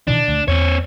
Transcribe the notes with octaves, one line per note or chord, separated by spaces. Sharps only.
B2 D#3 E3 D4
D2
E2 C4 C#5